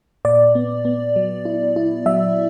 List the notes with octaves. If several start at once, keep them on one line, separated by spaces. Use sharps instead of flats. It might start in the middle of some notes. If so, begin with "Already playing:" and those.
A#2 D5
B3
B3
F#3
E4
E4
F#3 E5